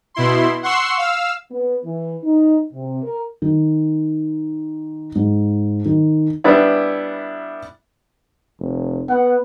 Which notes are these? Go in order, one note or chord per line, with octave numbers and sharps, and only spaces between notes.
B2 E4 C6
F#5 C6 C#6 E6 C7
F5 E6
B3
E3
D#4
C3
A#4
D#3
G#2
D#3
G3 B3 D4 E4
F1
B3 F#5